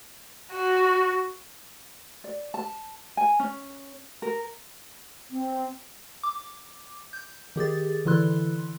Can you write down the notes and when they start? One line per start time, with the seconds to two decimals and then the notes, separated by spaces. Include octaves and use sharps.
0.52 F#4
2.24 D5
2.54 A5
3.17 G#5
3.40 C#4
4.22 A#4
5.30 C4
6.23 D6
7.13 G6
7.56 D#3 G4 G#4 A6
8.05 D3 E3 E4 C6 F#6